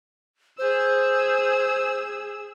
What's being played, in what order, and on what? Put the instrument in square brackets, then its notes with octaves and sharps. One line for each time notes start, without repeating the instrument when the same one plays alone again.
[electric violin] G#4 E6 [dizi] C5